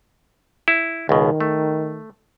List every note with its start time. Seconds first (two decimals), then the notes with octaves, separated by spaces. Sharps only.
0.68 E4
1.09 C#2 B2 D#3
1.41 A3